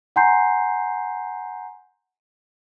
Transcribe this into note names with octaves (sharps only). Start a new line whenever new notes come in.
F#5 G#5 A#5 C6 G6 C7